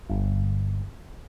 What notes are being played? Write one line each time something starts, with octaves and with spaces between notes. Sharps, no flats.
G1